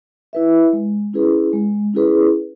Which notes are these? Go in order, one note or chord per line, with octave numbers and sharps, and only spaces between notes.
E4 B4 E5
G#3
C#4 E4 G#4 B4
G#3
C#4 E4 G#4 B4